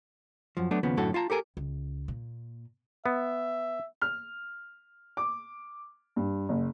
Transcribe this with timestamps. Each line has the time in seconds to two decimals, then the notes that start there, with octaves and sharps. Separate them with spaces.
0.57 F#2 F3
0.71 F#3 A3 B3 D4
0.83 D#2 C#3 F3 B3
0.97 F#2 A2 D3 A3 F#4 A4
1.14 F4 F5 A5 A#5
1.30 G4 A4 A#4 G#5
1.57 C#2
2.08 A#2
3.06 B3 E5
4.02 F6
5.17 D6
6.16 G2
6.49 F#1